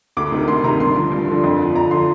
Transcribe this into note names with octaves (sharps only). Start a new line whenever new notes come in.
D2 D6
C3 D#3
D2 C6
C3 D#3 A#5
G2 C6
D3 F3
G2
D3 F3
F2
D3 F3
F2 A#5
D3 F3 C6